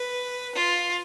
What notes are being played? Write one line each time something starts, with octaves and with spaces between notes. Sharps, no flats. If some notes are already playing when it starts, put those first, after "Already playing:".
Already playing: B4
F4